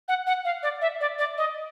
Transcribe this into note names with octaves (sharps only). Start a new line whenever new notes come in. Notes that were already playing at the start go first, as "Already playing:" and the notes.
F#5
F#5
F5
D5
E5
D5
D5
D#5